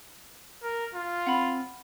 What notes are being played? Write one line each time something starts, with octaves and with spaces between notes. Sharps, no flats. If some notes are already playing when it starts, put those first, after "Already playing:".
A#4
F4
C4 F#5 B5